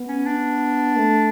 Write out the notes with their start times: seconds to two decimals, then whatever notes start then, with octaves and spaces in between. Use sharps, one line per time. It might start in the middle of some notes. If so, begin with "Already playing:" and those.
Already playing: B3
0.08 C#4
0.26 D4
0.97 A3